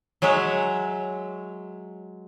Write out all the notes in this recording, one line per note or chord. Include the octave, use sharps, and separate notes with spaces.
F#3 G#3 C#5 E5